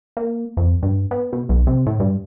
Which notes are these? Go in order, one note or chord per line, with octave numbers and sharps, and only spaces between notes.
A#3
F2
G2
B3
B2
B1
C3
A2
G2